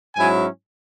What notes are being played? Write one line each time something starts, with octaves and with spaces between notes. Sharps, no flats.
G#2 F#3 C#4 E4 G#5